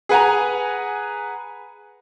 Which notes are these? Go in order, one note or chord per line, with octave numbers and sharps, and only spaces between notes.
G#4 B4 F#5 G#5 A#5